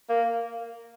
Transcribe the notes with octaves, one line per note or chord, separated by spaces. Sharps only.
A#3